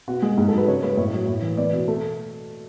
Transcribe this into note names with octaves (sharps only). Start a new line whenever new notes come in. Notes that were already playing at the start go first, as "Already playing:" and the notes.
B2 F#4
G#3
G#2 G#4
F#3 A4
B4
C#3 C#5
G#3 B4
A2 C#5
F#3
A2
E3
B3 D5
B2
A3